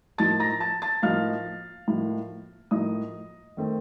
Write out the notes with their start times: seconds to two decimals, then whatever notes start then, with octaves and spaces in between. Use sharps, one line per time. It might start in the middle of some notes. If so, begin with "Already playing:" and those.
0.18 A2 F3 A#3 D#4 A5 A6
0.40 A#5 A#6
0.60 A5 A6
0.82 A5 A6
1.02 A2 F3 A#3 D#4 F5 F6
1.88 A2 F3 A#3 D#4
2.71 A2 F3 A#3 D#4 D#5 D#6
3.57 D#3 A3 C4